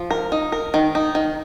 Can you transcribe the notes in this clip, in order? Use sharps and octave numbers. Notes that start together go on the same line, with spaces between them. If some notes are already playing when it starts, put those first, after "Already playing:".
Already playing: F3
A#4
D#4
A#4
D#3
D#4
D#3